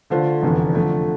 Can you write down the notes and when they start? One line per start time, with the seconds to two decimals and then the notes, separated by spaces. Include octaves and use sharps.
0.10 D3 A3 D4 F4 C5
0.42 F1 E2 D3 A3
0.74 D3 F3 A3